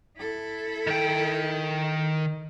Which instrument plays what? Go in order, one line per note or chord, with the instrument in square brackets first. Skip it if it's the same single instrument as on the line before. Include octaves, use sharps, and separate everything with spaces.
[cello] E4 A4
[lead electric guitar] D#3 G5